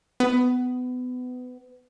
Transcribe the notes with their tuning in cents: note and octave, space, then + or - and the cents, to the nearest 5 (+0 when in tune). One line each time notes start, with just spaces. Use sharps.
B3 +25